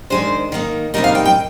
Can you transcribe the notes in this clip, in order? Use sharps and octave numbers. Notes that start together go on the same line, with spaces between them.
D#3 G#3 D4 C5
D#3 A#3 D#4
C3 G3 A#3 D#4 A#4
F5
G5
G5